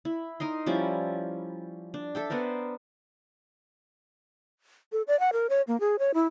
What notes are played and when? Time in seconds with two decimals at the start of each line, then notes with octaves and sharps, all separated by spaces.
0.05 E4
0.40 D#4 A#4 D#5 C6
0.66 F3 G3 C#4 E4
1.94 D4
2.15 A4 E5 G5
2.30 B3 D4 A#4 C5
4.92 A4
5.08 D5
5.20 F#5
5.33 A#4
5.50 C#5
5.68 A#3
5.80 G#4
5.99 C#5
6.14 E4